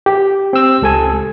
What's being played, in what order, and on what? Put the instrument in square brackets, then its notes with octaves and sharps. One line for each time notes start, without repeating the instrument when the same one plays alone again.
[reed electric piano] G4
[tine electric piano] C4 E6
C#2 A4 G#5